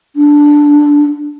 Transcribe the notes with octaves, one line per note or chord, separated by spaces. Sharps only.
D4